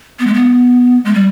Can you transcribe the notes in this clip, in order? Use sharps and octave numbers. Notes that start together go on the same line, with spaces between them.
B3
G#3
B3
G#3
G3